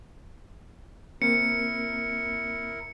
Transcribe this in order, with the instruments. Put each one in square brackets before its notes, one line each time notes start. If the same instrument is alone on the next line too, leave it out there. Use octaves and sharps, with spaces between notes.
[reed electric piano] A#3 C4 [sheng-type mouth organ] E4 A#4 [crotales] C#7